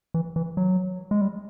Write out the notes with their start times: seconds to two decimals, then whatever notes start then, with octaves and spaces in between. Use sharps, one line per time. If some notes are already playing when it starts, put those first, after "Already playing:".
0.14 E3
0.36 E3
0.57 F#3
1.11 G#3
1.21 G3